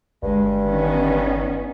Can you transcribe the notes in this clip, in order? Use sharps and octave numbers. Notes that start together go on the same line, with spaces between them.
G1 G2 G#3
D#3 B3 C#4